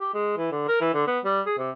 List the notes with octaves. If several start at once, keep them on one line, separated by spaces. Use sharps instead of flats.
G4
G#3
E3
D3
A#4
E3
D3
B3
G3
G#4
C3